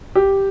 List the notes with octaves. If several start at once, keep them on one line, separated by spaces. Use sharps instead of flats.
G4